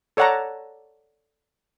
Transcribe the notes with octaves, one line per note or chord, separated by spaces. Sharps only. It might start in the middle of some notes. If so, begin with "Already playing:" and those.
A4 C#5 D5 F#5 A5 A#5